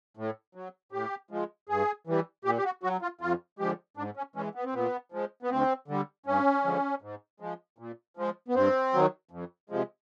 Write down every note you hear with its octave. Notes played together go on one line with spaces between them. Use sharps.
A2
F#3
A2 G4
F3 G#3
G2 G#4
E3 G3
A#2 G4
G4
F#4
F#3 F#4
F4
F2 F4
D3 F3 G#3 G4
G#2 D4
C#4
E3 G#3 C#4
B3
C4
A#2 B3
F3 G#3
B3
D2 C4
D3 G3
G2 C#4
D3 F3 G#3
G#2
F3 G#3
A#2
F3 G#3
B3
G2 C4
D#3 F#3
F2
C3 F3 G#3